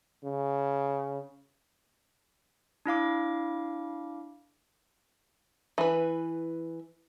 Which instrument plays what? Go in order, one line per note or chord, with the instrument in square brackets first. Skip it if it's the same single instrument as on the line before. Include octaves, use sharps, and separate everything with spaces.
[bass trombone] C#3
[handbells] D4 E4 F5 D6
[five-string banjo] E3 B4